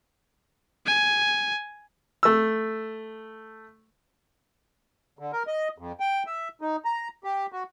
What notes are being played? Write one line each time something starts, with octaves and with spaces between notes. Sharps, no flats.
G#5
A3 E6
D3
A#4
D#5
F2
G5
E5
D#4
A#5
G4
F#4